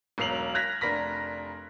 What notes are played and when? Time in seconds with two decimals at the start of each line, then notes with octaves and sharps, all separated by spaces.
0.18 E1 B1 A#4 C7 F7 F#7
0.55 F6 F#6 G#6 A#6 B6 F7
0.81 F1 D4 A#4 B5 A#6 B6